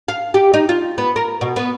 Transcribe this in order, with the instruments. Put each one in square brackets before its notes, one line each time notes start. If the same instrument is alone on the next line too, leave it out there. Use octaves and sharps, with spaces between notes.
[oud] F5
G4
D#4
F4
B3
A#4
B2
B3